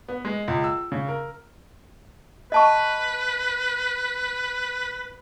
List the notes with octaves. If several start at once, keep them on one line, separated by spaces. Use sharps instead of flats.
B3
G#3
C#2
E6
C#3
A#4
B4 D#5 A5 C#6